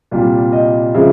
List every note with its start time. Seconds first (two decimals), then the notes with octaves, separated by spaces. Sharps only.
0.11 C2 A#2 G3
0.52 D#5
0.94 C#3 F3 G#3 E5